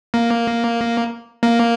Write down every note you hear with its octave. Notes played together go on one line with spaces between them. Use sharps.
A#3
A#3